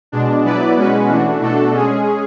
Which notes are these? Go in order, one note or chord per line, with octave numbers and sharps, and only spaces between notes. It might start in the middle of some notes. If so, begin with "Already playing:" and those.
B2 G#3 D4
F#3 B3 E4 B4 D5
B2 G#3 C#4 F#4 B4
E3 A3 D4 F#4
B2 A3 D4 F#4 A4
G#3 C#4 G#4